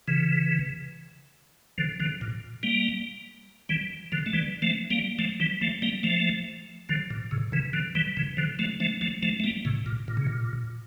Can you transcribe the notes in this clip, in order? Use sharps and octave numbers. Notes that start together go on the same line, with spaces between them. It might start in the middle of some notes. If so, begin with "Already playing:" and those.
C#3 E3
D3 F3
D3 F3
A#2
G3 A#3
E3 G3
D3 F3
A3
E3 G3
F3 A3
G3 A#3
F3 A3
E3 G3
F3 A3
G3 A#3
F3 A3
D3 F3
A#2
A2 C#3
C#3 E3
D3 F3
E3 G3
C#3 E3
D3 F3
F3 A3
F3 A3
F3 A3
F3 A3
A3
G3 A#3
A2 C#3
A#2
A#2
C#3
A#2